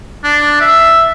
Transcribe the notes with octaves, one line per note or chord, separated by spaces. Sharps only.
D4
E5